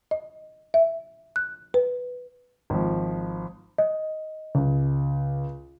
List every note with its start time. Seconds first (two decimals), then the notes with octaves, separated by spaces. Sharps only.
0.11 D#5
0.74 E5
1.36 F#6
1.74 B4
2.70 G#1 F3
3.78 D#5
4.55 C#2